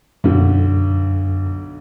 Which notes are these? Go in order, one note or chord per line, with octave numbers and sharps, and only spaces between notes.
B1 F#2 D3